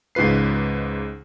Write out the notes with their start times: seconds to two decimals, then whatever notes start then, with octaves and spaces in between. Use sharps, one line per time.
0.15 C#2 G#2 F4 B4 C7